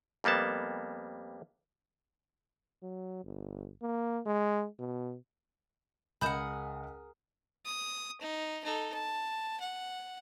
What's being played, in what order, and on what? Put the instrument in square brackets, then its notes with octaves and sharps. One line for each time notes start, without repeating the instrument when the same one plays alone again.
[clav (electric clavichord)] F2 G3 A#3 B3 A5
[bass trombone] F#3
G1
A#3
G#3
B2
[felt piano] C#2 D#5 [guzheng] G#4 A#4 F#5 [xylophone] B5 G6 E7
[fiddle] D#6
D#4
D#4 A4
A5
F#5